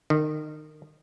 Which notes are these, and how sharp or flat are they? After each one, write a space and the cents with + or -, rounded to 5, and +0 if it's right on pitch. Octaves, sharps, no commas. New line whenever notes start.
D#3 -25